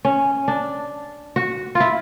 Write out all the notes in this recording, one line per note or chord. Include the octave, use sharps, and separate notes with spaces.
C#4
D4
F#4
F4
E4